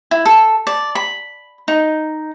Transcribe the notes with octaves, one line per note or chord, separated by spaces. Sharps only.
E4
A4
D5
B5
D#4